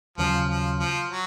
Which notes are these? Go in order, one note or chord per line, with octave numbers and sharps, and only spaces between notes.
D#2 C#3 F3 F#3
F3
F3
F#3